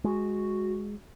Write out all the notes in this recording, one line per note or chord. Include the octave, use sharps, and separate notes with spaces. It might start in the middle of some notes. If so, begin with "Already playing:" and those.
G#3 F#4